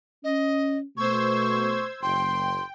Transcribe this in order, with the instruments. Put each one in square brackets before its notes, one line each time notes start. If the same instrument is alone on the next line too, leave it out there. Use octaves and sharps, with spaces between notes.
[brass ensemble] C#4 [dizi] D#5
[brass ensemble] B2 A3 [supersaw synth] C5 E6 G#6 [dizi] C#6
[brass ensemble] F#1 [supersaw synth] G5 [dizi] C6